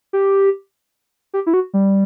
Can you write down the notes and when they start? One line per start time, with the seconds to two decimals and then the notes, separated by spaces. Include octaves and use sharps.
0.13 G4
1.34 G4
1.46 E4
1.54 F#4
1.74 G3